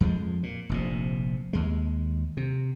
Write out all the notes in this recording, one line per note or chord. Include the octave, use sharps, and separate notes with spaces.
F2 F3 G#3
A#2
F1 A#1 C3
D#2 G#3
C3